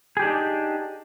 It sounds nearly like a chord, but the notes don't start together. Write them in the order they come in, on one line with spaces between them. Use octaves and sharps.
G#4 G4 D4 D#4